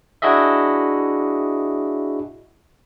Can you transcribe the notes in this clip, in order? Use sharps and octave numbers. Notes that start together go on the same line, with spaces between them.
D4 E4 F#4 G#4 D#5 E5